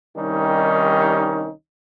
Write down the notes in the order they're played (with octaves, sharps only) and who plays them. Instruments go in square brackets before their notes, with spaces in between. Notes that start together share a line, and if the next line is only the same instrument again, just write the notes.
[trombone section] C2 D#3 G3 C#4 D#4